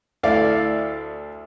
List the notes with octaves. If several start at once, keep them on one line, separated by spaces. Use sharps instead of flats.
D2 E4 A4 D5 F5